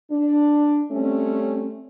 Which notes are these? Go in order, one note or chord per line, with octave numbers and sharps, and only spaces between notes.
D4
G3 A3 C4 C#4